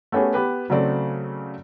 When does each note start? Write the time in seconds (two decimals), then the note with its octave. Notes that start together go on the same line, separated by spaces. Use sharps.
0.12 A3 B3 C#4 G4 G#4
0.34 B3 G4 B4
0.70 C#3 F#3 A3 C4 D5